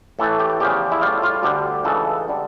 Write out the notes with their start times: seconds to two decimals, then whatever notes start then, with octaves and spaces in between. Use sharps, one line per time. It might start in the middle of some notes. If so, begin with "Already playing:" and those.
0.19 A2 E3 A3 A4
0.39 G4
0.60 E2 C#3 F3 G4
0.92 E4
1.01 A2 G3 F4
1.23 F4
1.43 D2 D3 G3 G4
1.84 C#2 C#3 E3 A4
2.28 D3 G3